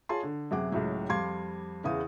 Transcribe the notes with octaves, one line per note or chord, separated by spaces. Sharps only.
F4 G#4 C#5 A5 C6
D3
F#2 C3 G#4 F#5 D6
C#2 A2 F#3
F2 G3 F5 C6 D6 G#6
E2 C#3 E3 F5 D#6